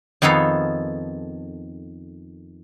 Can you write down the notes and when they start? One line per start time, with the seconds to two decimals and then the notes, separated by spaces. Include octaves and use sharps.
0.22 F2 D#3 B3 G#4 A4 F5